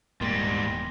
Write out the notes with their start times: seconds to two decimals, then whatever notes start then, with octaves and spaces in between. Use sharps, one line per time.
0.21 D#1 E2 G#2 G3 A#3 C6 A#6